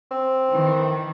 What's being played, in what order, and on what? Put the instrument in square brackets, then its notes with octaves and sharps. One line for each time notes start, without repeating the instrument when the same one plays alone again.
[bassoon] C4
[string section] D#3 E3